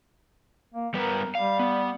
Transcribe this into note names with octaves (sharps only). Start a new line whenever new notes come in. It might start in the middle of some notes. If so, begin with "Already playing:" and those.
A#3
G3 B3 A#4 B4
G3 F5
B3